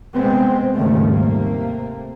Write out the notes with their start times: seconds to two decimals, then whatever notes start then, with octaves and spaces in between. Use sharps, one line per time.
0.15 C3 G#3 B3 C4
0.74 D#2 G#2 C#3 F3 G3 A3
1.13 C3 A3 A#3